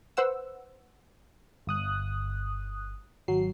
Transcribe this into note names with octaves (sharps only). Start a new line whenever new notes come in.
B4 C5 F#5 E6
G1 D#6 F#6
G#1 F#3 C7